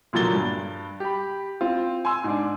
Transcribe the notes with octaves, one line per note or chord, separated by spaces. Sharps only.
D2 A#2 F3 F#3 A6 G7
G2
G4 B5
C4 F4
G#5 C6 E6
G#2 D4